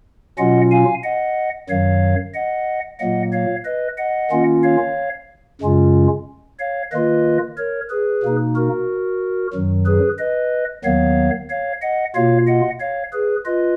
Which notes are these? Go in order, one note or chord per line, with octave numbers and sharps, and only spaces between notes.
B2 F#3 C#4 F4 D#5 F#5
F5 G#5
D#5 F#5
F#2 D#3 F#3 C#5 F5
D#5 F#5
A#2 F#3 A#3 D#5 F#5
C#5 F5
B4 D#5
D#5 F#5
D#3 A#3 C#4 F4
C#5 F5
F#2 C#3 G#3 C#4 F4
C#5 F5
D#3 A#3 F4 B4 D#5
A#4 C#5
G#4 B4
B2 A#3 D#4
F#4 A#4
F#2 D#3 F#3
G#4 B4
B4 D#5
D#2 D#3 F#3 B3 C#5 F5
C#5 F5
D#5 F#5
B2 A#3 F4 C#5 F5
D#5 F#5
C#5 F5
G#4 B4
F4 B4 D#5